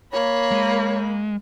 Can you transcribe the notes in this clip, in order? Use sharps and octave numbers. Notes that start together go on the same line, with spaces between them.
A#3 C#5 B5
G#3